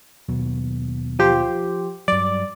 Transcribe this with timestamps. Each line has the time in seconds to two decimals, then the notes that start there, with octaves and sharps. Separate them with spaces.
0.29 D#2 B2 F#3
1.19 F3 G4 C5
2.08 G2 F#3 D5